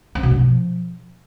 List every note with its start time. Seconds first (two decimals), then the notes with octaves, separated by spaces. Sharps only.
0.15 C4
0.23 B2
0.31 G2
0.39 F3